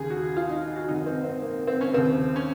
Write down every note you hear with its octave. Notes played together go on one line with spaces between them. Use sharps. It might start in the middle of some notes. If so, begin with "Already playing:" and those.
Already playing: D#2 C#3 G#4
F#4
F4
D#4
F#4
G#1 F#2 D#3 D#4
C4
C4
A#3
C4
C#4
D#2 C#3 C4
C#4